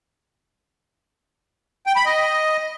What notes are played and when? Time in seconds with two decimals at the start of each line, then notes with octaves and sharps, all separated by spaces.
1.87 G5
1.96 B5
2.06 D#5